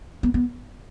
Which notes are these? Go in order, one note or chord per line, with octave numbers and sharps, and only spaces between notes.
B3
B3